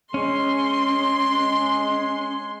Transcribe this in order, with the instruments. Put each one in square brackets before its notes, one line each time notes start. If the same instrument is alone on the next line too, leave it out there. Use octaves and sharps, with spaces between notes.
[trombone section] G#3 [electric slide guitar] C#4 [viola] C6